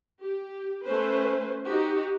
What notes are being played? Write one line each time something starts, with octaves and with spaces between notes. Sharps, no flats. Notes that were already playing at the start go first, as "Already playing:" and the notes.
G4
A3 C#4 B4 C5
D#4 F#4 G4